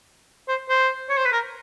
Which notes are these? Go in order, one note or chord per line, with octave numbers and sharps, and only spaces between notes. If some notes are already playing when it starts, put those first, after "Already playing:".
C5
C5
C#5
C5
B4
A#4